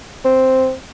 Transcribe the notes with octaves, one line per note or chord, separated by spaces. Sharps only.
C4